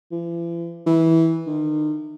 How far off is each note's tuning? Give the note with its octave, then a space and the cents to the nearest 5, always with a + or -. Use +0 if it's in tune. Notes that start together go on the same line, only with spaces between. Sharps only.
E3 +45
E3 -15
D#3 -40